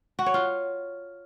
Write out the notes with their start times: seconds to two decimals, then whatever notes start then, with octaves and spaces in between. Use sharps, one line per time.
0.19 F#4
0.26 C#5
0.34 F4